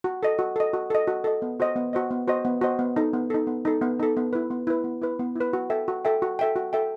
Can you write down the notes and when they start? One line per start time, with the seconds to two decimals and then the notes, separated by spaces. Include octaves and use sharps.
0.04 F#4
0.23 A4 D#5
0.39 F#4
0.56 A4 D#5
0.73 F#4
0.90 A4 D#5
1.07 F#4
1.24 A4 D#5
1.42 B3
1.60 F#4 C5 D#5
1.76 B3
1.93 F#4 C5 D#5
2.11 B3
2.28 F#4 C5 D#5
2.45 B3
2.61 F#4 C5 D#5
2.79 B3
2.96 D#4 A4
3.13 B3
3.30 D#4 A4
3.47 B3
3.65 D#4 A4
3.81 B3
4.00 D#4 A4
4.17 B3
4.33 E4 B4
4.51 B3
4.67 E4 B4
4.84 B3
5.02 E4 B4
5.19 B3
5.36 E4 B4
5.53 F#4
5.70 A4 E5 G5
5.88 F#4
6.05 A4 E5 G5
6.22 F#4
6.39 A4 E5 G5
6.56 F#4
6.73 A4 E5 G5